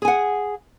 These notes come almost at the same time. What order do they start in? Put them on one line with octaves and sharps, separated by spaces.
G#4 G#5 F#5